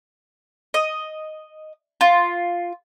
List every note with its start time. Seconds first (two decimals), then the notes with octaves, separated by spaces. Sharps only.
0.74 D#5
2.01 F4